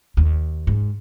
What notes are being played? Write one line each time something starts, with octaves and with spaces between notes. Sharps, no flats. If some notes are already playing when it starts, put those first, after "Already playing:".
D#2
G#2